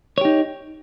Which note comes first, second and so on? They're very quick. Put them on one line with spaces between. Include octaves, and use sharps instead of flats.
C#5 G4 D#4